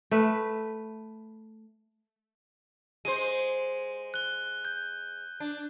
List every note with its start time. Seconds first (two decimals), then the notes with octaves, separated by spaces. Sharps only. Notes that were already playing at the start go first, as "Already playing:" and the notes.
0.11 A3 B4
3.05 G#3 C5 D#7
4.14 F#6 G7
4.65 G6
5.40 D4